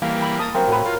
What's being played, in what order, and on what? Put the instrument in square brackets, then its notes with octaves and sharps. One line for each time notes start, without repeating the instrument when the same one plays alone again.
[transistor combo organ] E3 G3 A#3 [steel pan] F5
[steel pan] G5 B5
[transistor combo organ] A#3 [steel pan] A5 D#6
[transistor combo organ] F#3 [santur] C4 A#4 F5
[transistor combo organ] A2 [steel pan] F#4 A#4 [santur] B4 C#5
[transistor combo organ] F4 [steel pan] A#4